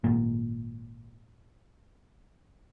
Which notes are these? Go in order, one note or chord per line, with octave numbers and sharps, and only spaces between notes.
G#1 A#2